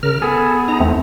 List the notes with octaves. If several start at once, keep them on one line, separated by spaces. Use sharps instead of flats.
C#3 A#4 F6
B3 G#4 A4
D#4 A#5
E2 A3 C4